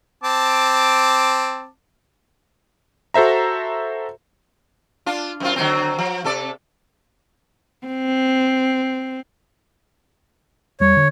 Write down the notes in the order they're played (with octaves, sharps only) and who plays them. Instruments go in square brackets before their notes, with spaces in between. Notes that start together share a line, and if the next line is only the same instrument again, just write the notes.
[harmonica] C4 A5 D6
[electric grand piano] F#4 A4 C5 E5 A#5
[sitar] D4 F4
F#2 C4 F4
D3 F#3 C4
F3
C3 A4 D5
[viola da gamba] C4
[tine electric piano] E2 G3 [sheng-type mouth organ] C#5
[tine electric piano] D3